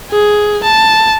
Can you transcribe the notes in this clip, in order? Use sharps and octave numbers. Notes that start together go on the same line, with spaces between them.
G#4
A5